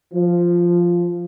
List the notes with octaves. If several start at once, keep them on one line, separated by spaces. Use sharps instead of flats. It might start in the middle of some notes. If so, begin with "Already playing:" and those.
F3